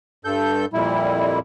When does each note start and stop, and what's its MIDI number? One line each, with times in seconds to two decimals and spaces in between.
0.25 0.65 43
0.25 0.65 69
0.25 0.65 91
0.73 1.39 41
0.73 1.39 46
0.73 1.39 55
0.73 1.39 64